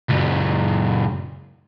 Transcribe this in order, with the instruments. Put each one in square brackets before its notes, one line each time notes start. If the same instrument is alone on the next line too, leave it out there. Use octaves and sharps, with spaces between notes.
[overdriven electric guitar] C#2 F#2